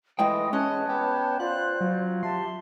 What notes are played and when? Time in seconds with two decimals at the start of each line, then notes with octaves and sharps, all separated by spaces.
0.19 A2 E3 G#3 D#5 G5 D#6
0.53 G#3 C#4 C#5 D#5 A5 F#6
0.89 B3 G4
1.40 F4 C5 D5 F#6
1.81 F#3 F4
2.23 G4 E5 A5 C6